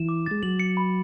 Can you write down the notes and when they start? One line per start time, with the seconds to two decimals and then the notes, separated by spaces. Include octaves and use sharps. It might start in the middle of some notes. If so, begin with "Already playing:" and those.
Already playing: E3 E7
0.09 D6
0.26 G#3 A6
0.43 F#3 F#7
0.59 C#7
0.77 B5